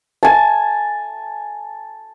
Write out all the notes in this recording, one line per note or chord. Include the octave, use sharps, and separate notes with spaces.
G#5 A5